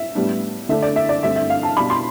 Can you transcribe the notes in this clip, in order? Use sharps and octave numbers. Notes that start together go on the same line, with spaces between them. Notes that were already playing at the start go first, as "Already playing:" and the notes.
Already playing: E5
A2 G3 B3 D4
D3 A3 D4 E5
D5
E5
D5
G2 D3 A3 C4 E5
E5
F5
A5
B2 G3 D4 B5
C6